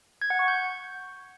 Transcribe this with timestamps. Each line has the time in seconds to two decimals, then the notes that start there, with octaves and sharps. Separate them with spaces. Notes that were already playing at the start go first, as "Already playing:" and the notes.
0.21 G#6
0.30 F#5
0.39 C#6
0.48 G6